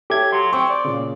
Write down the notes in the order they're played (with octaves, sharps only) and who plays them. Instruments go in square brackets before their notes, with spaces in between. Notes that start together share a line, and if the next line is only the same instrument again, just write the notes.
[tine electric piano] G4 G#6 [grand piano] A4 C#5 E5
[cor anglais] F#3 [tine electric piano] C6
[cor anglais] C4 [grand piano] C#6
[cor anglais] D5
[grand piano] A#2 C#3